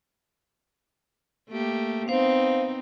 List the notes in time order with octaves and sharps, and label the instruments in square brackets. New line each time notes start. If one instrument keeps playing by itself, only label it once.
[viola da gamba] A3 A#3 G4
[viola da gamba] B3 C4 D#4 [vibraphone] C5 F5